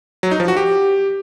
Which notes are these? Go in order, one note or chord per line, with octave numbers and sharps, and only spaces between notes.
F#3
D#4
F3
F#4
G4